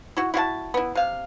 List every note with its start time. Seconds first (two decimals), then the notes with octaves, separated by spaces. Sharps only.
0.17 E4 F#4
0.34 E4 F#4 F5 A5
0.74 B3 E4
0.95 C3 F5